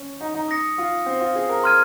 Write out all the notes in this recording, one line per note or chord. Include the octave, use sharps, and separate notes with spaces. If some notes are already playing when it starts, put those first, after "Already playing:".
Already playing: C#4
D#4
D#4
D#6 A#6 C#7
F4
C4
F4
G#4
A#4
C6 F6 G#6 D#7